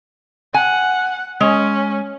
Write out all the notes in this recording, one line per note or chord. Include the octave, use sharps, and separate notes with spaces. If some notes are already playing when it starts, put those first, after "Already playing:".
F#5 G#5
G#3 C#4